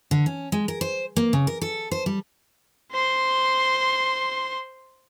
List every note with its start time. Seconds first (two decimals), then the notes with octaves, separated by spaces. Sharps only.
0.11 D3
0.26 C#4
0.52 G#3
0.68 A#4
0.81 C5
1.17 A#3
1.33 C#3
1.47 A#4
1.62 A4
1.91 C5
2.06 G3
2.92 C5 C6